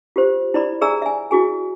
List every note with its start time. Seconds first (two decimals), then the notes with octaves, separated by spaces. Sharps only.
0.16 F4 G4 C5
0.54 E4 D5 B5
0.81 G#4 D5 E5 G#5 A#5 E6
1.02 E5 G#5
1.31 E4 F#4 G#4 G#5